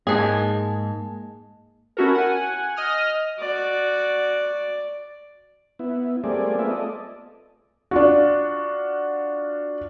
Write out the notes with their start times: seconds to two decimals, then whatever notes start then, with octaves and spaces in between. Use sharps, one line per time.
0.07 G#2 G#3 A#3 G#4 A5
1.97 C#4 E4 F#4 A4 A#4
2.15 F#5 G#5
2.76 D#5 D#6 F6
3.39 F#4 D5
5.79 B3 E4
6.24 G3 A3 A#3 C4 G#4 D5
6.59 A3 B3 C4 F4 G#4 E5
6.71 A4 D5 D#5
7.91 D4 F4 F#4